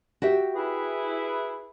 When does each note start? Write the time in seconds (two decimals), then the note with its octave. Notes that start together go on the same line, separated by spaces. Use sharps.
0.22 F#4 G4 E5
0.55 E4 G#4 B4